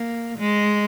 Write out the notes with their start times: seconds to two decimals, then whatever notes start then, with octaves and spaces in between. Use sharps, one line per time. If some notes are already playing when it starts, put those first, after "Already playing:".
Already playing: A#3
0.38 G#3